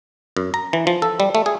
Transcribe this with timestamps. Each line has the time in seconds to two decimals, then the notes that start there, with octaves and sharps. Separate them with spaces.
0.37 F#2
0.54 A#5
0.73 E3
0.87 F3
1.02 A4
1.20 G3
1.35 A3
1.46 G#4